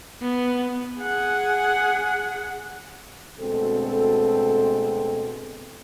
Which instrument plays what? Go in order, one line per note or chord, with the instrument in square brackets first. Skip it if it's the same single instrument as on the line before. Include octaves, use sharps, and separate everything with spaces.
[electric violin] B3
[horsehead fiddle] G#4 F#5
[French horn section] D2 B2 G#3 C4 A4